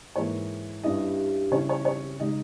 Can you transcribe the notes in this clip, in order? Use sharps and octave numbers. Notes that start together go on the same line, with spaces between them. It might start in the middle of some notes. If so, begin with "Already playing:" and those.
G#2 E3 A#3 C#5
G2 G3 C#4 E4 D#5
C#3 G3 C#4 E4 C#5
C#5
C#5
C#3 G#3 D#4 D#5